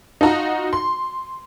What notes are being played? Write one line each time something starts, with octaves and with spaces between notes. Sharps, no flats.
D#4 F4 F#4 A#5
C6